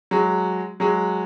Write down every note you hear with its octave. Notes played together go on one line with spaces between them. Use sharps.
F#3 G#3
F#3 G#3